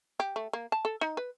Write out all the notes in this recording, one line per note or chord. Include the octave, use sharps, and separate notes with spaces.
G4
A3
A#3
A5
A4
D#4
B4